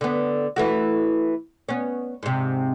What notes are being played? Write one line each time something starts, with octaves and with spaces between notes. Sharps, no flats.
D3 B3
E3 A3 F#4
B3 C#4
G#2 C3